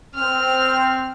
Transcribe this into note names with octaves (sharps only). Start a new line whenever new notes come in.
C4 F6